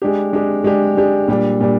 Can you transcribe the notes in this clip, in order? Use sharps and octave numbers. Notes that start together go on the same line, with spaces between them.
G#3 D4 G4
G#3 D4 G4
G#3 D4 G4
G#3 D4 G4
A#2 G3 D4
A#2 G3 D4